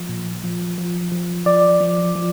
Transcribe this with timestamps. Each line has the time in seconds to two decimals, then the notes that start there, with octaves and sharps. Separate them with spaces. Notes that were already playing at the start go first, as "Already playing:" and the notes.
Already playing: F3
0.09 A#2
0.44 F3
0.78 F3
1.12 F3
1.46 F3 D5
1.81 F3
2.15 F3